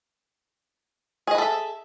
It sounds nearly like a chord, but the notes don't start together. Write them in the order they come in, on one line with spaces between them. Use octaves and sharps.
G#4 D#5 B4 A4 E5